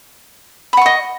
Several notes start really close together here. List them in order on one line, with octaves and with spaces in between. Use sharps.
B5 F#5 C#6 D#5